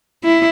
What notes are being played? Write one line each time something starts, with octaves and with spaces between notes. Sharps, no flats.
E4